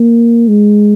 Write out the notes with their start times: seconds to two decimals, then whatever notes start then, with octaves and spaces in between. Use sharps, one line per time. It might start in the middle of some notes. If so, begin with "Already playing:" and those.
Already playing: A#3
0.48 G#3